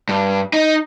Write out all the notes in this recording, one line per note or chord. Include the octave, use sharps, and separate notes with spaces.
G2
D#4